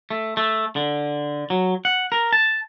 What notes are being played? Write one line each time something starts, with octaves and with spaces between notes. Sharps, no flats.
A3
A3
D3
F#3
F#5
A#4
A5